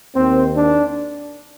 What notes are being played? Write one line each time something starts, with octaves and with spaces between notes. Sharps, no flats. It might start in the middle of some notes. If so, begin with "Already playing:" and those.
D#2 D#3 C4
D4